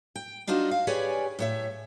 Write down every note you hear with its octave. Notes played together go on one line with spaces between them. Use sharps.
G5
D4 D#4 F4 F#4 C5
F5
G4 G#4 B4 C#5 D5 G#5
A2 C#5 E5